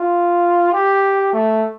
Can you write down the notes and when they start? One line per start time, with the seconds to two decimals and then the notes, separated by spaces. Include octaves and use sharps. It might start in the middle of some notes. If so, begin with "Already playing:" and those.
Already playing: F4
0.73 G4
1.33 A3